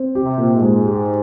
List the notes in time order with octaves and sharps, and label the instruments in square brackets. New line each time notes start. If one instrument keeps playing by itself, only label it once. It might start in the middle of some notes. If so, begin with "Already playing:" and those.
Already playing: [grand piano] C4
G4
[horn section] C3
[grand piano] A#2
[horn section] G#2
[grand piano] G#3
G4